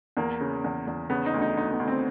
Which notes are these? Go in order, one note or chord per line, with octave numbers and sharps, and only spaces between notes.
E2 A#3
C#3
E2
E2
C#3 B3
D#4
D2
D#4
D2 D#4
B3
D2
C4